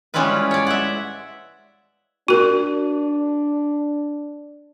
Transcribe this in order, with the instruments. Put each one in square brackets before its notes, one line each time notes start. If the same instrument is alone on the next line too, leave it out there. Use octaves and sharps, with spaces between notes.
[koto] G3 G#3 C#4 E4 F4 B4
C#5 D5
E5 F#5
[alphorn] D4 [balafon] F#4 A#4